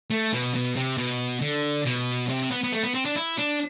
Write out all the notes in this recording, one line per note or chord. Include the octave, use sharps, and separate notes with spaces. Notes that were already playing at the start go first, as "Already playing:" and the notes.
A3
B2
B2
C3
B2
D3
B2
C3
C4
B3
B3
A3
B3
C4
D4
E4
D4